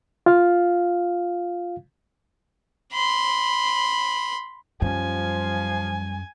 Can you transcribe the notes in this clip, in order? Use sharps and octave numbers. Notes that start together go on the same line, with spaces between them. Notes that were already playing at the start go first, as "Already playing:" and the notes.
F4 F5
B5 C6
F#2 F3 G3 C#4 G#5